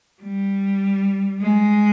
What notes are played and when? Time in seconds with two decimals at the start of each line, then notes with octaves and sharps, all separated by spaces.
0.23 G3
1.42 G#3